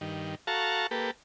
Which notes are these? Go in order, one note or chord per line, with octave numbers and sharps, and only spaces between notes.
G2 D#3
F#4 A4 F5 A5 A#5 C#6
A#3 G4 A4 B4